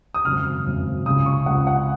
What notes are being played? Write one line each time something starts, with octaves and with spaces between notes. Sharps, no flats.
D#6
G#1 F#2 C#3 F6
G#1 F#2 C#3
C#2 C#3 D#6
C#6
C#2 C#3 F#5
F#5